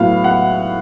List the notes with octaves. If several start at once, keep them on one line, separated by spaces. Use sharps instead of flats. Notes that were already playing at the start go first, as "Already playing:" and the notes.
Already playing: A2 F#3 B3 F5
F#5